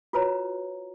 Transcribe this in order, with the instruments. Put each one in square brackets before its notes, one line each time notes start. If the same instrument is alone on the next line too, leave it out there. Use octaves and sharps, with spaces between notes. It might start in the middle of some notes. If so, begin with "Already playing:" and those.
[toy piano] F4 F#4 B4 C#5 A#5